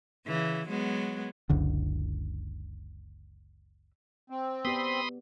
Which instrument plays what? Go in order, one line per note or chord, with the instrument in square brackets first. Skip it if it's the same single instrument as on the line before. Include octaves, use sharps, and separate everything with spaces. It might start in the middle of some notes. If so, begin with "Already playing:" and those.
[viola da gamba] C#3 E3
F#3 G#3 B3
[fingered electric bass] F#1 C#2 D3
[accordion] C4
[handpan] B3 G4 D5 [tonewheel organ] B5 C6 D#6